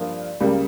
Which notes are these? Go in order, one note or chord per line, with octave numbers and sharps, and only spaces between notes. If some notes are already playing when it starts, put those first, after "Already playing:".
Already playing: G2 F3 A#3
C#2 C#3 G3 A#3